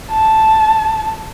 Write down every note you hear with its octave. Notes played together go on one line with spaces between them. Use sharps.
A5